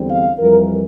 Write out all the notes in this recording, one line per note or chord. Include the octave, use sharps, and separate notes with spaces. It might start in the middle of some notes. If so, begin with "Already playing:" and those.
Already playing: E2 D3 G3 C4
F5
F2 E3 G3 A#4